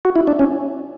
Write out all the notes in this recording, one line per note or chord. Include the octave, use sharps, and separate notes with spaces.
F#4
E4
D4
C#4